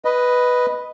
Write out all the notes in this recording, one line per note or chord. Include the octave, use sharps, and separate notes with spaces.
B4 D#5